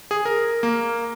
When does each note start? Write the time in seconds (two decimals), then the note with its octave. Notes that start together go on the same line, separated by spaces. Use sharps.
0.11 G#4
0.25 A#4
0.63 A#3